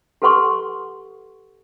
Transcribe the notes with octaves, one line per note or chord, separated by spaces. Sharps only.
G4 A4 B4 F#5 C6 C#6